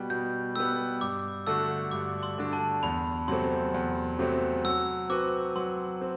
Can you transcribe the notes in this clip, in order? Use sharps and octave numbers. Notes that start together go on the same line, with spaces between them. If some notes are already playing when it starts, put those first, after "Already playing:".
Already playing: B2 G3 B3
B2 G6
G3 B3 E6
G2 D6
D3 A3 D4 F#4 E6
G2 D6
C6
D3 A3 D4 F#4
A5
E2 B5
C3 F#3 A3 C4 C6
E2
C3 F#3 A3 C4
F#3 E6
C4 F#4 B4 D6
F#3 C6
C4